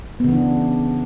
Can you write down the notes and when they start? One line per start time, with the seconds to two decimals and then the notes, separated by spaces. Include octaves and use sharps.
0.20 B3
0.24 C#3
0.29 E3
0.33 D4